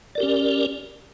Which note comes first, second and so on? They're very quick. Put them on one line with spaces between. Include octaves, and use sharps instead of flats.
D5 A#4 G4 C#4